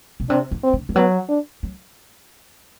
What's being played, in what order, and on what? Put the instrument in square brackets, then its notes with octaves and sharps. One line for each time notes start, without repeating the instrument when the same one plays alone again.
[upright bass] B2
[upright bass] C3 [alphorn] D4
[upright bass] E3
[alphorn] C4
[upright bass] D3
E3
[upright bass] F#3 [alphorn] B3
[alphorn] D4
[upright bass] F#3